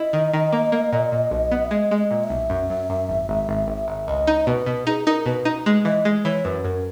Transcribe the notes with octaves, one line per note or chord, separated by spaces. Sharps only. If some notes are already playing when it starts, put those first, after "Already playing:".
Already playing: E4 D#5
D#3
D#3
A#3
A#3
A#2
A#2
B1
B3
E5
G#3 D#5
G#3
D#5
A#2
E5
B1
F#2
F#2
F#2
G#1
G#1
G#1
G#1
G#1
C#2 D#5
D#4
B2 B4
B2
D#4 G#4
D#4 A#4
B2 B4
D#4
G#3
E3 D#5
G#3
E3 C#5
F#2 B4
F#2 A#4